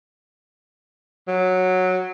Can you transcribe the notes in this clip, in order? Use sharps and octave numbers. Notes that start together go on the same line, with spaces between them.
F#3